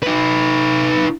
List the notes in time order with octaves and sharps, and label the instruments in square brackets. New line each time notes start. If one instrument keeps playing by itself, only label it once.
[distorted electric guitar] D#4 B4